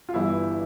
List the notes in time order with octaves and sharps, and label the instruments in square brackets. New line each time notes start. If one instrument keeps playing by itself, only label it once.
[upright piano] F4
G1 G2 E3 G3 E4